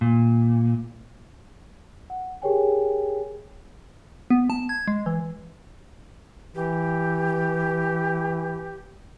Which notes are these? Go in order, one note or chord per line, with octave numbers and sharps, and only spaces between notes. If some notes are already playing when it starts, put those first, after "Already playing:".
A#2
F#5
G4 G#4 A#4 C#5 G5 G#5
B3
A5
G#6
G#3
E3
E3 G4